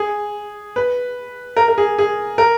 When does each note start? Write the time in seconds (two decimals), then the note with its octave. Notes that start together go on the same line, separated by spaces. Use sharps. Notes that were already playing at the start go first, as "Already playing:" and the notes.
Already playing: G#4
0.76 B4
1.57 A#4
1.68 A#4
1.78 G#4
1.98 G#4
2.38 A#4